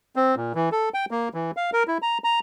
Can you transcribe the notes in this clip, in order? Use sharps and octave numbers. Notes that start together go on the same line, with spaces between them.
C4
A#2
E3
A4
G5
A#3
E3
F5
A#4
E4
A#5
A#5